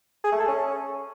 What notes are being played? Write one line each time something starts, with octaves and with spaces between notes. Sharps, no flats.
G#4
A3
A4
C#4